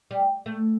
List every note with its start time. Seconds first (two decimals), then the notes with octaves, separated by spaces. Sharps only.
0.11 G3
0.46 A3